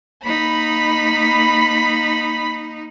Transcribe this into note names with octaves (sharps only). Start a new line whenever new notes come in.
A#3 D#4 B5 B6